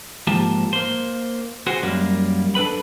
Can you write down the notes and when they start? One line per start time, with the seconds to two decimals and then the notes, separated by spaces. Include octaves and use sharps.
0.27 G#2 F3 A#3 G4 A5
0.73 A#3 C5
1.67 F#4 G#4 C5
1.82 F#2 G3 A#3
2.55 D4 A4 B4 B5